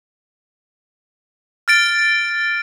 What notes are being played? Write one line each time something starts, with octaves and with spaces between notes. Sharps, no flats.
F6 A6 D7